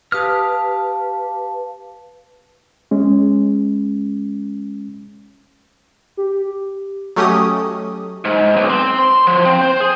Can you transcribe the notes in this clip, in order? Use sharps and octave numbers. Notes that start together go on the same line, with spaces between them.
G4 B4 F5 A5 D#6 F6
G#3 C#4
G4
F#3 A3 C#4 G4 D#5 D#6
G#2
B1
C4
C6
F3
C4
C5
G#4